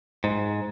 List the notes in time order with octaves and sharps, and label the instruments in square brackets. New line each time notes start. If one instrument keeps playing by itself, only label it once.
[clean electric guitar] G#2